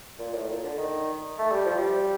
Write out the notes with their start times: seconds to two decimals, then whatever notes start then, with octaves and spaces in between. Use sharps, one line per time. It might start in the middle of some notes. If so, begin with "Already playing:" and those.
0.19 A#2
0.34 A2
0.49 A#2
0.64 D3
0.78 D#3
1.39 A3
1.52 G3
1.65 F3
1.78 G3